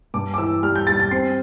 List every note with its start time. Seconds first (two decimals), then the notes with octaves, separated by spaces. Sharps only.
0.14 G2 D6
0.34 D6
0.38 E3 E6
0.62 G3 F6
0.76 G6
0.87 G3 A6
0.99 A6
1.11 C4 C7